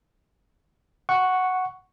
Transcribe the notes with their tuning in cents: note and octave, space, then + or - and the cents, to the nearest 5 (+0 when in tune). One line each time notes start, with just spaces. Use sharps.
F#5 +0 C#6 +0